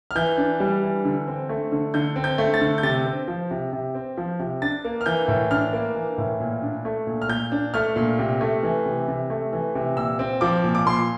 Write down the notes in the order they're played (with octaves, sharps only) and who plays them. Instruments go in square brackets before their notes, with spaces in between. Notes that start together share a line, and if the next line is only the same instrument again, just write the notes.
[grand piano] F6
E3 G6
D4
G3
E3
D3
C4
A3
D3
D3 G6
C4
G6
A3
A6
D3
G6
C3 A6
C4
F3
C3
C3
C4
F3
C3
D4 A6
A#3
F6
E3 G6
A2
D4 F6
A#3
E3
A2
A#2
D4
A3
A#2
F6
A#2 G6
D4
A3 F6
A#2
C3
A3
E3
C3
C3
A3
E3
C3
A#2 E6
C4
F3 D6
A#2
D6
A#2 C6